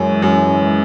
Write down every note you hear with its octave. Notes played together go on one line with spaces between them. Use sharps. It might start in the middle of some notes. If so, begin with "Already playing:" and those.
Already playing: F#2 E3 G#3 C#4
F#2